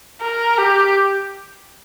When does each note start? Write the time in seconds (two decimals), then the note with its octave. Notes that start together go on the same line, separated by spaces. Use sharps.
0.21 A#4
0.58 G4